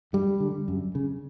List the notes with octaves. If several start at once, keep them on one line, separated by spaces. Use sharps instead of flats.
G2 G3
D3
F#2
C#3